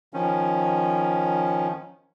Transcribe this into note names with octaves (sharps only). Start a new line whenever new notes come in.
D#3 F3 C#4